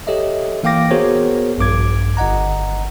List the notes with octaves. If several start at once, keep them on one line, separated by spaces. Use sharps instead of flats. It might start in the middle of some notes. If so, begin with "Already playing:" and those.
G4 A4 C#5 D#5 E5
E3 A#3 F5 G5 D6 A#6
B3 F#4 G#4 A#4 C5 C#5
A#1 G2 D6 G#6
G1 D#5 F#5 A#5